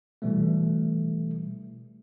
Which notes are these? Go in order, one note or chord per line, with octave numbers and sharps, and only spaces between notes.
B2 E3 G3 A3